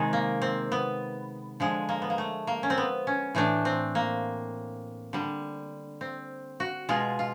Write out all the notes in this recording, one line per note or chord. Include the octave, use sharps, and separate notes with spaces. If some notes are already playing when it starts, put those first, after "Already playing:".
Already playing: C3 D#3 G#3
A#3
C4
B3
D3 F3 G#3
A#3
B3
A#3
A3
A#3
C#4
C4
B3
C#4
A2 E3 A3 D4
C4
A#3
D3 G3
C4
F#4
B2 G#3 F4
F4